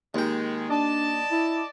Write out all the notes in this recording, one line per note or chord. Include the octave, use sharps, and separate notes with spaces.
D#2 D#3 G#3 G5
D4 D5 D#5 A5
E4